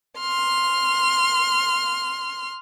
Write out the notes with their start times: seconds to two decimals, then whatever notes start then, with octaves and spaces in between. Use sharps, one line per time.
0.20 C6 F6